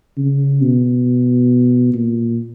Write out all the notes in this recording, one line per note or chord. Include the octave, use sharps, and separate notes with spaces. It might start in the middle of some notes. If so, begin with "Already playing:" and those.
C#3
B2
A#2